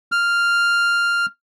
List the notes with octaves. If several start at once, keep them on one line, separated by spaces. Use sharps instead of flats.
F6